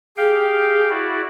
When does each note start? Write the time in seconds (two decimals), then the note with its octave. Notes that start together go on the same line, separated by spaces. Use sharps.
0.17 G4 G#4 F5 G5
0.90 E4 F#4 D5